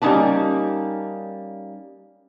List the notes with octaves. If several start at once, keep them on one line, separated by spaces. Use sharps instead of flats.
G3 A#3 C#4 D#4 B4 A5